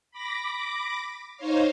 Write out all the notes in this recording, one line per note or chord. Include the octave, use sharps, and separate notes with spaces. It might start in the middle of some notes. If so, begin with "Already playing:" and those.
B5 D6 A#6
D#4 C5 C#5 F5